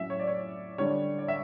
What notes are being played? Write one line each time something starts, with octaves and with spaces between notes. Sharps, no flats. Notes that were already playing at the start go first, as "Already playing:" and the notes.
Already playing: A2 F#3 C#4 E5
C#5
D5
C#5
D3 G3 D4 C#5
D5
E5